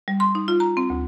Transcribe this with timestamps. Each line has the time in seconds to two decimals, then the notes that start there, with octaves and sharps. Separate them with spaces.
0.08 G3
0.20 C6
0.35 D#4
0.48 F4
0.60 A#5
0.77 C4
0.90 D2